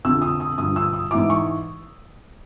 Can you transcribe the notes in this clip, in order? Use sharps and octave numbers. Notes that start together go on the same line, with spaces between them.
F2 D3 F3 E6
D#6
D#6
G2 D3 F3 D#6
E6
D#6
G#2 E3 D6
C#6